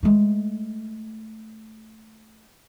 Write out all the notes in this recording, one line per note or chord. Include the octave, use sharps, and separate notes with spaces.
G#3 A3